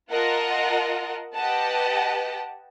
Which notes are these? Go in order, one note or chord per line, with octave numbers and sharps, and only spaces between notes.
F4 A#4 D#5 F#5 A5
G4 B4 D#5 F#5 A5